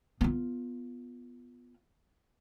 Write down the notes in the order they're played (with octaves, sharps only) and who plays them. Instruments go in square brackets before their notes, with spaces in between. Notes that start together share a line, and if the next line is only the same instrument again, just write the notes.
[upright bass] B3 F4